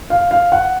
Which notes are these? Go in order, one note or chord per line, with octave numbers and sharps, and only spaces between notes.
F5
F5
F#5